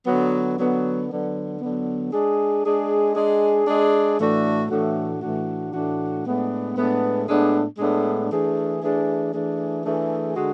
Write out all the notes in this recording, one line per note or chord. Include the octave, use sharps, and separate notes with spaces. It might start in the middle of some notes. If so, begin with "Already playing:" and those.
D3 F#3 B3
D3 F#3 B3
D3 F#3 B3
D3 F#3 B3
G#3 D4 G#4
G#3 D4 G#4
G#3 D4 G#4
G#3 D4 G#4
A2 E3 A3 D4 F#4
A2 E3 A3 D4 F#4
A2 E3 A3 D4 F#4
A2 E3 A3 D4 F#4
A2 G#3 B3 D4
A2 G#3 B3 D4
A2 G#3 B3 D4
A2 G#3 B3 D4
E3 A3 D4 G#4
E3 A3 D4 G#4
E3 A3 D4 G#4
E3 A3 D4 G#4
D3 G#3 D4 F#4